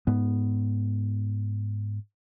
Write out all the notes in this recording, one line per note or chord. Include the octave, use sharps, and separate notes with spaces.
G#2 B3